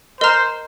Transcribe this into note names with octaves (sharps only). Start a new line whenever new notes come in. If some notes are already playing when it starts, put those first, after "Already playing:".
A#4 C5 D#5 A#5 F6